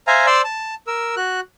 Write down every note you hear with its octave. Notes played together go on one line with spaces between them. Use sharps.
C5 E5 F5 G#5 A#5
C5 D5 C6 E6
A5
A#4 E6
F#4 F#6